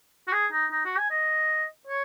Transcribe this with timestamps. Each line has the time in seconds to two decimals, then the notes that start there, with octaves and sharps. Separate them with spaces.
0.27 F#4
0.32 G#4
0.52 D#4
0.71 D#4
0.85 F#4
0.97 G#5
1.10 D#5
1.87 C#5